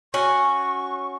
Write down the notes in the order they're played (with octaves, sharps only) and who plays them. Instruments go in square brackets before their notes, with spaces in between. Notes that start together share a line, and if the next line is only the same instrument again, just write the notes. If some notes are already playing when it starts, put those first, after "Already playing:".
[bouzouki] C#4 F#4 [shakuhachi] C#6